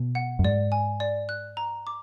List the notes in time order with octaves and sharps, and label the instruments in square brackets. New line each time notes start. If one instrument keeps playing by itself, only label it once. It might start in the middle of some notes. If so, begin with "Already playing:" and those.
Already playing: [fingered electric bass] B2
[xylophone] F#5
[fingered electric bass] F#2
[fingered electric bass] G#2 [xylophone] D5
[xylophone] G#5
D5
F#6
A#5
D6